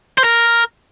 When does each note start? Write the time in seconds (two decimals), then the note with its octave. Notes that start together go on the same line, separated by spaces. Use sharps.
0.18 C5
0.24 A#4